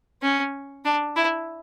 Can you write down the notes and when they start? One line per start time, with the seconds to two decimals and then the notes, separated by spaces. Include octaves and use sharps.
0.22 C#4
0.85 D4
1.16 E4